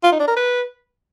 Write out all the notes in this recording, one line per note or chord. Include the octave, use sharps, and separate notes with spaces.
F4
D#4
D4
A#4
B4